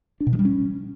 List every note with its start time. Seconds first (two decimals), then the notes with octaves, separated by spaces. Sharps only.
0.20 D4
0.27 B2
0.33 F3
0.39 G3
0.45 C#4